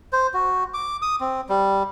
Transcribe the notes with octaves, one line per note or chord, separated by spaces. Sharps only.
C5
F#4
D6
D#6
C4
G3